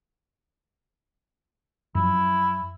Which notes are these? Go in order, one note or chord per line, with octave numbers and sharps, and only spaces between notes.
F#2 F3 F#3 E4